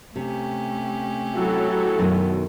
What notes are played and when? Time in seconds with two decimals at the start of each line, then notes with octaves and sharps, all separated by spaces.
0.16 C3 A3 C#4 G4
1.34 F#3 E4 A4
1.98 F#2 B2 D#3